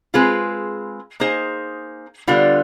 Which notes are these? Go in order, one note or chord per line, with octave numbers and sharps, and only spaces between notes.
G#3 C4 F4 G#4 B4
A#3 D#4 G#4 C5
D3 G3 B3 D4 F4